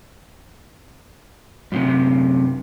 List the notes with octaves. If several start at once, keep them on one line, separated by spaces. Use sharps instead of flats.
F#2 A2 C3